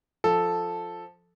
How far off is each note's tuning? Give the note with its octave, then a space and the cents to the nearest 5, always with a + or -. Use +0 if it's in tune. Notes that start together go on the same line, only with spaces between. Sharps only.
F3 +0 A4 -5